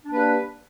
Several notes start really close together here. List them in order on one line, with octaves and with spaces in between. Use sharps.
D4 A#3 B4 G3